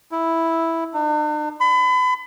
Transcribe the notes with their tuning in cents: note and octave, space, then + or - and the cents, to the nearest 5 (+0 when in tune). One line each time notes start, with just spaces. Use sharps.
E4 -5
D4 +45
B5 +35